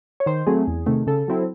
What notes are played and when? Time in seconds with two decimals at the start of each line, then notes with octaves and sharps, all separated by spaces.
0.20 C#5
0.26 D#3 C5
0.47 F#3 A3 C4 G#4
0.67 E2
0.86 C3 D#3 A3
1.07 C#3 A4
1.28 F#3 C4 E4